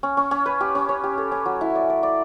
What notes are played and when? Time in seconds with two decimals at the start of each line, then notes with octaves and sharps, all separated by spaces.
0.03 C#4
0.17 C#4
0.31 C#4
0.46 B4
0.61 G4
0.75 C#4
0.89 C#5
1.04 G4
1.18 A4
1.32 C#4
1.46 F#3
1.61 E4
1.75 D5
1.90 D5
2.03 D5